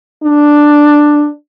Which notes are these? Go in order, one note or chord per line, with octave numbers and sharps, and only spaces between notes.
D4